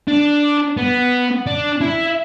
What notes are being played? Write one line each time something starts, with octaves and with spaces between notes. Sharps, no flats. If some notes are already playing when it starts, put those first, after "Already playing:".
D4
B3
D4
E4